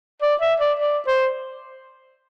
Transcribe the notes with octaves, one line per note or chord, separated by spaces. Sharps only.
D5
E5
D5
D5
C5